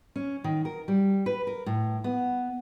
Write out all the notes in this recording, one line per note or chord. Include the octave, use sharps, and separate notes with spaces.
C#4
D#3
A#4
G3
B4
A#4
A2
B3